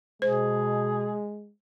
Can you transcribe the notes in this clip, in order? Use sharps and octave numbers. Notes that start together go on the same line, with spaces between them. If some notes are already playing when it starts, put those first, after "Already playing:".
B2 G#3 G#4 C5